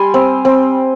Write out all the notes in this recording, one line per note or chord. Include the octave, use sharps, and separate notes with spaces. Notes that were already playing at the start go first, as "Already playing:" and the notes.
Already playing: G3 G#5 C6
C4
C4